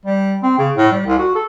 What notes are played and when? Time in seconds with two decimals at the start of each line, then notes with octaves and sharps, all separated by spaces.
0.05 G3
0.43 C4
0.58 C#3
0.76 A2
0.91 G3
1.06 C2
1.19 F#4
1.35 A4